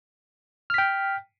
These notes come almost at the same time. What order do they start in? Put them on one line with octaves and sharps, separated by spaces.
F6 B6 G5